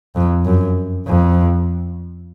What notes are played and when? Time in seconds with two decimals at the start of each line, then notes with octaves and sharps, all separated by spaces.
0.15 F2
0.45 F#2
1.07 F2